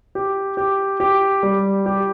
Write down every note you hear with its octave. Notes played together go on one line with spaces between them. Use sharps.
G4
G4
G4
G3
G4